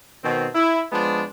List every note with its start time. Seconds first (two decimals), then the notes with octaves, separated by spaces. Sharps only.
0.24 B2 D#3 C4
0.55 E4
0.92 F3 G#3 B3 D4